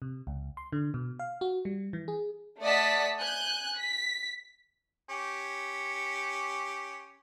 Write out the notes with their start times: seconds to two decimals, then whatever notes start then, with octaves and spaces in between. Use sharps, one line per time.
0.02 C3
0.27 C#2
0.57 C6
0.72 D3
0.94 B2
1.19 F5
1.41 F#4
1.65 G3
1.93 E3
2.08 G#4
2.61 A3 D5 D#5 F#5 A5 B6
3.20 G#5 F#6 G6
3.77 B6
5.09 C#4 G4